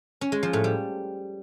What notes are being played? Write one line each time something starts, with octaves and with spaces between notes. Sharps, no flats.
C#4
G#3
F3
A2
G3